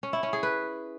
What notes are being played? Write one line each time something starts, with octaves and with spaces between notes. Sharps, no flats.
C#4
E4
C#4
G#4
B4